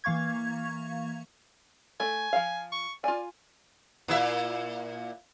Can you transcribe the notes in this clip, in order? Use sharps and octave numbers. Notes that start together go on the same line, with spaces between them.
E3 A#3 F5 C#6 G#6
A3 G#5
F3 F5
C#6
F4 D5 G#5
A#2 E4 E5